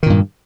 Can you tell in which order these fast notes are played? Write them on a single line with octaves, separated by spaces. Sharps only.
D#3 A#2 G2